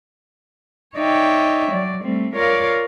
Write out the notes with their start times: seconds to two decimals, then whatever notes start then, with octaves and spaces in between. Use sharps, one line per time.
0.96 D#4 C#5 D5 E5 G5
1.71 F#3 D5
2.03 G3 A3 C4
2.35 F4 A#4 C#5 D5 F5